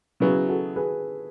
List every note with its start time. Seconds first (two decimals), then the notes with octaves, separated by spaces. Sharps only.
0.20 C#3 F#3 B3 E4 G#4
0.48 F#4 A4
0.76 G#4 B4